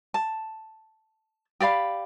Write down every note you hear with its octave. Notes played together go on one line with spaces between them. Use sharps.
A5
G4 D5 F5 B5